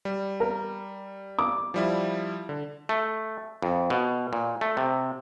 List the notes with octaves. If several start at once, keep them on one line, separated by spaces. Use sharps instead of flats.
G3
A#4
D6
F3 G3 E4
D3
A3
F2
B2
A#2
A3
C3